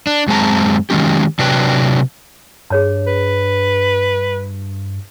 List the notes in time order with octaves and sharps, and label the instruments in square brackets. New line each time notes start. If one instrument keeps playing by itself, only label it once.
[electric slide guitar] D4
F#2 G#3 C4 A5 A#5
D#3 F#3 G#3 C#4 G4
C3 F#3 D4 B4 G5
[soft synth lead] G2 [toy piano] G#4 C#5 A5
[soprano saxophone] B4